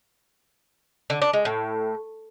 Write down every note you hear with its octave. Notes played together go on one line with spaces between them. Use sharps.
D3
D4
G#3
A2